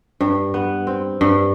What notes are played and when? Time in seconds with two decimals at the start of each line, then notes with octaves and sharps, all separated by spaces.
0.21 G2
0.54 B3
0.87 C4
1.21 G2